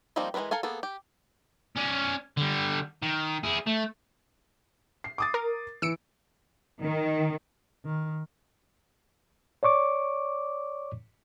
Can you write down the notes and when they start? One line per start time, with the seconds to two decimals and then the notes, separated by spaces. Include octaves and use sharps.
0.16 F3 G3 A#3 C4 D#4
0.34 E3 G#3 C4 A#4 B4
0.51 A4 A#4 F5 G#5
0.63 A#3 B3 G#4 A4
0.83 G4
1.76 C#4 D5
2.37 D3 G3
3.03 D#3
3.44 E4 G#4
3.66 A3
5.04 C7
5.18 D6 D#6 A6
5.34 A#4
5.82 E3 E6 C#7 D7
6.82 D#3
7.85 D#3
9.63 C#5 D5 C#6 D6